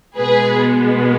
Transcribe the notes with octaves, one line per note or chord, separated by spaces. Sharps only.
B2 G#3 B3 G#4 B4